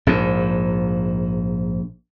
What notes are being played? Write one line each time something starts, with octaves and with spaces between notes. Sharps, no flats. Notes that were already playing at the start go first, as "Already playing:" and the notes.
A#1 G#2